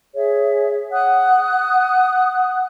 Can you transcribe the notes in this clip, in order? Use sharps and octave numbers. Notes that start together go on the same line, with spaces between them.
G#4 C#5 E5
F#5 D#6 F#6